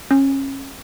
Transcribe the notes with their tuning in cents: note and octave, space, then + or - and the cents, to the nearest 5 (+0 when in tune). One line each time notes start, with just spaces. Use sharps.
C#4 -25